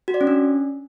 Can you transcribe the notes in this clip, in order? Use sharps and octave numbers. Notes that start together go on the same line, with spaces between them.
F#4
D5
C#4
D4